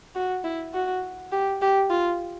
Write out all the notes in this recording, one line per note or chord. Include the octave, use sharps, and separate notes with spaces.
F#4
E4
F#4
G4
G4
F4